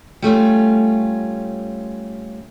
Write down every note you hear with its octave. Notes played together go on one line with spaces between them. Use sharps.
G3 A3 C#4 F4